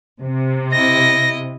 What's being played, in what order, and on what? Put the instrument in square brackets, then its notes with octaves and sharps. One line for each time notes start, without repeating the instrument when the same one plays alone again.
[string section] C3
[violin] E4 D#5 [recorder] A#6